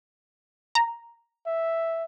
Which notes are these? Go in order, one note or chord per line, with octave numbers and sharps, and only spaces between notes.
A#5
E5